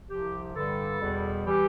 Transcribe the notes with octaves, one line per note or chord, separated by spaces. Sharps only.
C2 C3 F3 G4
G2 D3 G3 A4
E2 B2 G3
E3 G3 G4